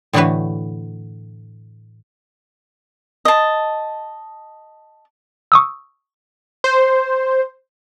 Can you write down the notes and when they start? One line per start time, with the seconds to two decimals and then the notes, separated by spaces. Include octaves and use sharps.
0.13 A2 D3 E3 A3 F#4 B4
3.25 D#5 A5
5.52 C#6 D#6 E6
6.64 C5